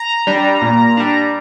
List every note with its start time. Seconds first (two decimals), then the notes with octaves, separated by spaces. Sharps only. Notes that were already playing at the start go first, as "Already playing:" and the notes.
Already playing: A#5
0.27 G3 D4
0.62 A#2
0.97 G3 D4